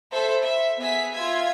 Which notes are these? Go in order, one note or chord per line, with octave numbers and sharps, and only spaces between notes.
A4 C5 E5 B5
E5
B3 G#4 E5 B6
F4 E5 G#6